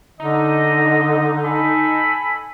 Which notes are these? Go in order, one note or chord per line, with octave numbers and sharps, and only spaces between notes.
D3 D#4 D#5
A4 G#5 B5